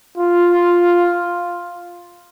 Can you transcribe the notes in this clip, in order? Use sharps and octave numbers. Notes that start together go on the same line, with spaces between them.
F4